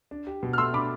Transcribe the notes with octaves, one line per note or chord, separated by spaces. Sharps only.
D4
G4
B2
F6
A3 C6 E6
D4 B5 D6